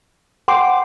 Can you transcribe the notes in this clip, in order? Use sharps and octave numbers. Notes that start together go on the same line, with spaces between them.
F#5 G5 C6 D6